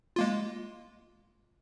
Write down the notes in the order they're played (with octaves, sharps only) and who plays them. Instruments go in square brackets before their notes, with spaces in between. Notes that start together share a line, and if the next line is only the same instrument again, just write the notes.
[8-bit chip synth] G#3 A#3 F4